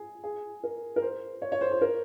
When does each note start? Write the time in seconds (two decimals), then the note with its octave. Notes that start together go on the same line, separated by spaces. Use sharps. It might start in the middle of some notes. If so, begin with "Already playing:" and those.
Already playing: G#4
0.23 G#4
0.63 A#4
0.96 A#4
1.02 C5
1.42 C#5
1.52 C#5
1.61 C5
1.71 C5
1.81 A#4